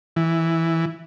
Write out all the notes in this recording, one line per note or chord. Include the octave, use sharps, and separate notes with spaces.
E3